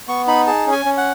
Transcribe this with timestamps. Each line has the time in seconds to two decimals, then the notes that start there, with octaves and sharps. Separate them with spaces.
0.08 B3 C#6
0.27 D#4 B5
0.47 G#4 A5
0.67 C#4
0.72 G#5
0.85 C#4
0.98 F#5